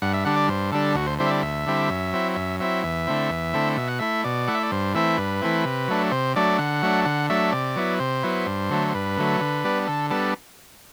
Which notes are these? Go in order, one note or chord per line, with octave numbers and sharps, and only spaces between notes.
G2 F#5
E5
D3 G3 D4 F#5
D5
G2 C5
D3 G3 D4 A4
D2 F#4
C5
D3 G3 C4 E4 C5
E5
D5
D2 E5
D3 G3 C4 E4
F#2
F#3 C4 E4
F#2 E5
F#3 C4 E4 E5
E2 E5
D3 A3 C4 E4
E2
D3 A3 C4 E4
B2 E5
F#5
A3 E4 E5
B2 D5
A3 E4 F#5
E5
D5
G2 C5
E3 A3 C4 E4 E5
G2 B4
E3 A3 C4 E4
C3
F#3 A3 D4
C3 C5
F#3 A3 D4 D5
D3 F#5
F#3 A3 D4
D3 F#5
F#3 A3 D4 E5
C3 D5
F#3 B3 E4
C3 C5
F#3 B3 E4
G2
D3 F#3 A3
C5
G2 B4
D3 F#3 A3
D3
G3 B3 D4
D3 A4
G3 B3 D4 A4